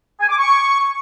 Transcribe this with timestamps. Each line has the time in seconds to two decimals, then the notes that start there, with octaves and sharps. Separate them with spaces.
0.20 G#5
0.29 D6
0.38 C#6